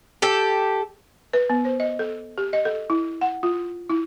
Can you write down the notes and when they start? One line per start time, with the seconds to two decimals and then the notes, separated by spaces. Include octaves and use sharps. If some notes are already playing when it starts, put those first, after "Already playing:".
0.22 G4 A4
1.33 B4
1.50 B3
1.65 C5
1.80 D#5
1.99 A4
2.38 G4
2.53 D#5
2.65 A4
2.90 E4
3.21 F#5
3.43 F4
3.90 E4